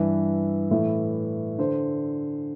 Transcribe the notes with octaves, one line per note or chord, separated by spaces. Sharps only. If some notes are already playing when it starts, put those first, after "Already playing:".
Already playing: G2 E3 B4
A2 E3
D3 C5